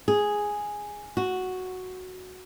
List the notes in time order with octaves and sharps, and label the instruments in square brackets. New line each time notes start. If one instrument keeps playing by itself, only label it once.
[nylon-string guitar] G#4
F#4